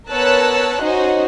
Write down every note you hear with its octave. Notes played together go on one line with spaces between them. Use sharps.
B3 A#4 C#5 A5 E6 F#6
C#4 D#4 F#4 C5 D#5